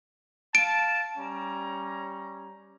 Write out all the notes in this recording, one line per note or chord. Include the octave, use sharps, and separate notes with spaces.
F5 A5 D7
G3 C#4 A#5